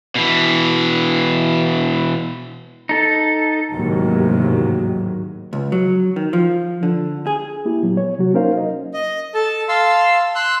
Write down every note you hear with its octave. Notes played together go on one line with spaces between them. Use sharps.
B2 E3
D#4 A4
A1 D#2 G#2 C3 D#3 F#3
C#2
F#3
D#3
F3
D3
G#4
A#3 E4 G4
A#2 F#3 B3
C#5
C3 F#3 F#4
A#3 C#4 D#4 A#4 C5 F5
D#5
D#5
A4 A5
F5 A5 C6 E6
C6 E6 F#6